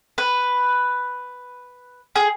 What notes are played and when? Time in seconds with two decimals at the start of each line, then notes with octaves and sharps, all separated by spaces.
0.18 B4
2.16 G#4